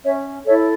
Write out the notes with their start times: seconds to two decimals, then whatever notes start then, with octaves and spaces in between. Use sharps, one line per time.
0.04 C#4 C#5 E5
0.45 E4 A4 C#5 E5